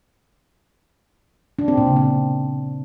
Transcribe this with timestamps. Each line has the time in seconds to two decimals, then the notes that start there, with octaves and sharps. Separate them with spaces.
1.59 D4
1.68 C4
1.77 A#2
1.87 C#3
1.96 C4